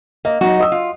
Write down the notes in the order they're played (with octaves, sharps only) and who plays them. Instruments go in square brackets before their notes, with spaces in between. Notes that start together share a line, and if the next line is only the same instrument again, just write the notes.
[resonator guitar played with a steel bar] A#3 [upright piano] D#5
[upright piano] F#3 [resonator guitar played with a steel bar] D#4 F#4
[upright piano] D#5 D#6 E6
[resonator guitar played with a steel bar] F4